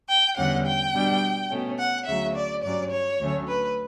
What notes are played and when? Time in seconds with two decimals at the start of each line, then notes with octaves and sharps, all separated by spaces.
0.09 G5
0.36 E2 D3 G3 C#4 F#5
0.66 G5
0.93 B2 G3 D4
1.50 B2 A3 C#4
1.78 F#5
2.06 D2 C#3 F#3 E5
2.35 D5
2.63 G2 F#3 C#4 D5
2.91 C#5
3.19 D2 D3 F#3 A3 C#4
3.48 B4